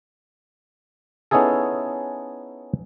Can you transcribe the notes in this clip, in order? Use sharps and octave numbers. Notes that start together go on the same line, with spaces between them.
B3 C#4 D#4 E4 G#4 A4